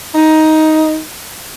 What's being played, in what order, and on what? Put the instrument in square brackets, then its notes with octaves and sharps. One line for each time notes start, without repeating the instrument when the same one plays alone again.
[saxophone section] D#4